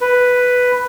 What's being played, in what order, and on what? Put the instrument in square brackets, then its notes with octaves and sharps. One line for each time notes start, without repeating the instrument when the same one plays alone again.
[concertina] B4